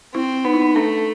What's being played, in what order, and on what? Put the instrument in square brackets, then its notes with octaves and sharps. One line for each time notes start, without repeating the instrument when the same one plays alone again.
[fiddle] C4 [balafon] E4
[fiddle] B3 [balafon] D#4
[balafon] E4
D#4
[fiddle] A3 [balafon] D4